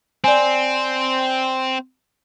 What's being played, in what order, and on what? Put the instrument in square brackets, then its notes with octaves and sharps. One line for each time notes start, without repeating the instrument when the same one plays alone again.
[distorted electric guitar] C4 [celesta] D5 G#5